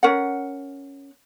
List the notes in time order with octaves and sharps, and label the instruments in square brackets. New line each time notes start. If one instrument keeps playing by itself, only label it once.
[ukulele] C#4 A#4 F#5